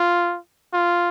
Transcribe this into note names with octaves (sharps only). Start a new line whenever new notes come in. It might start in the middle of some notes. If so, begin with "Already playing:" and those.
Already playing: F4
F4